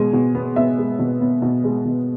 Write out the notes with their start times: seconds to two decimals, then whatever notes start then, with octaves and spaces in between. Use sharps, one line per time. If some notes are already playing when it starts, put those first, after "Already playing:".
Already playing: B2 G#3 G#5
0.13 B2
0.35 B3
0.56 B2 E5
0.78 G#3
0.99 B2
1.21 B3
1.42 B2
1.64 G#3
1.85 B2